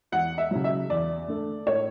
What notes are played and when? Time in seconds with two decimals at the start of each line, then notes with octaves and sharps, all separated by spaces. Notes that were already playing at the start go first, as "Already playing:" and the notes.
0.12 E2 F#5
0.38 E5
0.51 C#3 F#3
0.64 E5
0.90 E2 D5
1.28 D3 A3
1.67 A2 C#5